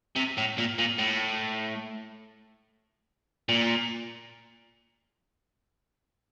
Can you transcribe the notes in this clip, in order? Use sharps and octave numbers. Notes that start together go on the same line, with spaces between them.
C3
A2
A#2
A#2
A2
A#2